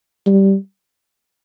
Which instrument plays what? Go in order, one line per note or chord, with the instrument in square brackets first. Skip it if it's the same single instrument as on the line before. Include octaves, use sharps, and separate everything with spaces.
[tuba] G3